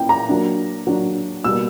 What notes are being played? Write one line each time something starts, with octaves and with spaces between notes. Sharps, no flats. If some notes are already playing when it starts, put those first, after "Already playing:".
Already playing: A#2 A#3 C#4 E4 G5
A#5
F#3 A#3 D4
F#3 A#3 D4
B2 G3 A#3 E6